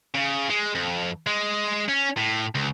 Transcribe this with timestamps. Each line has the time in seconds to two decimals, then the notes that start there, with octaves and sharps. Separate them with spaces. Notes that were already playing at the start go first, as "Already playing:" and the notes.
0.15 C#3
0.49 G#3
0.75 F2
1.27 G#3
1.89 C#4
2.17 A2
2.55 C#2